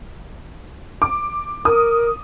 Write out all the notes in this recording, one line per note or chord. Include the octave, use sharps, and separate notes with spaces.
D6
A#4 D#6